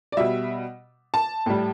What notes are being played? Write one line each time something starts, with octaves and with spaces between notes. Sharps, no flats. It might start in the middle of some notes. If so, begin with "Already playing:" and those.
D5
B2 G3 E5
A5
A2 G3